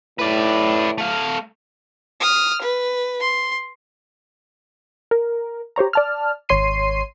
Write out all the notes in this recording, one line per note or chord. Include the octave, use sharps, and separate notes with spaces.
A2 B4 D5
A3 F5
D#6 F6
B4
C6
A#4
G4 C5 C#5 A#5
D5 A5 F6
G#1 C#5 C6 C7 D#7